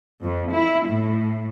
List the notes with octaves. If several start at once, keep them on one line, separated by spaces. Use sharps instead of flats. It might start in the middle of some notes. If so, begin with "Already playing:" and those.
F2
E4
A2